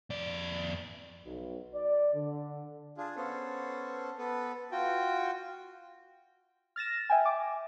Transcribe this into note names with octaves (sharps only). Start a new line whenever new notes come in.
F2 D5
B1
D5
D3
D4 F4 G#4
B3 C#4 A4 C5
B3 A4 B4
F4 F#4 G5
F6 A6 A#6 E7
E5 G5 G#5
D6